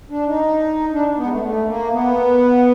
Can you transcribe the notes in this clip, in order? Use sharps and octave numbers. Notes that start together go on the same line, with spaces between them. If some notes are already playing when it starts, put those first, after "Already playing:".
D4
D#4
D4
B3
G#3
A3
A3
A#3
B3